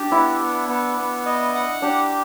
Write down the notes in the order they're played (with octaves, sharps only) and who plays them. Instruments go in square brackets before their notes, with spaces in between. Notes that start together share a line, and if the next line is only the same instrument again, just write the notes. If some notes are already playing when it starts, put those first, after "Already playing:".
Already playing: [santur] D4 [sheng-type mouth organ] G4
[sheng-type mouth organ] B3 [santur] E4
[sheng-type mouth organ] B3
B3
B3
D#5
F#5
[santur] D4 [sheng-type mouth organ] G4